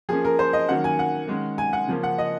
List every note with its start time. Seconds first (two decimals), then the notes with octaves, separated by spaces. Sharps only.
0.09 F3 A#3 C#4 G#4
0.25 A#4
0.39 C5
0.53 D#5
0.68 D#3 F#3 A#3 C#4 F#5
0.84 G#5
0.99 F#5
1.28 D#3 G#3 C#4
1.58 G#5
1.73 F#5
1.88 C#3 F3 A#3 C#4
2.03 F#5
2.18 D#5